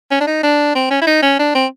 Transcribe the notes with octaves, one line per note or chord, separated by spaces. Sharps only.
C#4
D4
D#4
D4
C4
C#4
E4
D#4
C#4
D4
C4